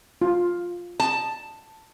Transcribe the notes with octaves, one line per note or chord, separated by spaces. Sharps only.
F4
A5